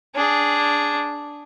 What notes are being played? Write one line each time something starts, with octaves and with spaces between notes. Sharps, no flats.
D4 G#4